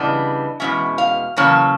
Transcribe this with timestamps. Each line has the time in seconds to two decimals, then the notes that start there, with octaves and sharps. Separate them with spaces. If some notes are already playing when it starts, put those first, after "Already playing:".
Already playing: C#3 E3 G3 B3 D4 D#5
0.60 E2 B2 G#3 C#4 E5
0.98 F5
1.37 E2 C#3 F#3 A#3 C#4 A5